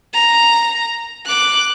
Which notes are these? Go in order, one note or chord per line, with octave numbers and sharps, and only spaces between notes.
A#5
D6 F#6